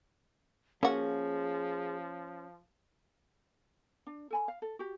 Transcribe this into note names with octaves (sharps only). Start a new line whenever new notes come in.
F3 A#3 C#4 F#4 G#4
D4
A4 G#5 B5
F5
A4
F#4 G4